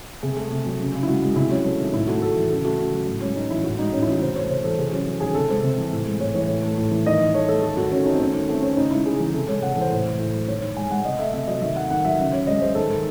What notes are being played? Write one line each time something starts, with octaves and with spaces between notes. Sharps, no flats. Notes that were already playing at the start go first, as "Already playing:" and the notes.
C3 G#4
A3
C3
F#3
C#3
C#3
E4
G#3 F#4
G#3
C3 E4
F#3 C#4
A3
D#3
A2 E4
A3 F#4
A2 A4
E3
C#3 A4
A3 F#4
C#3
F#3
A2
G#3 C#4
A2 D#4
E3 E4
A2 F#4
G#3 D#4
A2 C#4
E4
E3 F#4
C3 C5
A3 C#5
C3 C5
E3 A4
C3 G#4
F#3 C#4
A3 C#4
D#3 G#4
C3 A4
G#3 C5
C3
E3
A2
G#3
A2 C#5
E3 C#5
A2
A3
A2
E3
D#3 D#5
D#3
A3 C#5
A3 A4
D#3 A4
D#3 F#4
A3 C#4
A3 D#4
C4
D#3 C#4
D#3
A3 C4
A3 C#4
C#3 D#4
G#3 E4
C#3 G#4
E3
G#4
C3 A4
G#3 C#5
C3 F#5
A4
E3 C5
A2
A3
A2
F#3
D#3 C#5
D#3
G#3 G#5
G#3 F#5
C3 D#5
A3 E5
C3 E5
F#3 D#5
D#3 E5
A3 F#5
D#3 F#5
F#3 E5
C#3 E5
C#3 C#5
G#3 D#5
G#3 C5
D#3 A4
D#3